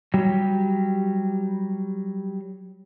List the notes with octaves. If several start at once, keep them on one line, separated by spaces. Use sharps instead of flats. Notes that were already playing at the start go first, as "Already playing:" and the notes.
F#3 G3 G4